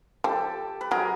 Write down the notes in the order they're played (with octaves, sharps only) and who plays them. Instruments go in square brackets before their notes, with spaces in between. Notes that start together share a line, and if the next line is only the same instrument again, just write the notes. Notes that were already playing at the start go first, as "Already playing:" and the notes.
[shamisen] F3 [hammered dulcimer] G4 A4
[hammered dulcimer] B4
[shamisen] F#3 [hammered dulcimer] G#4 A#4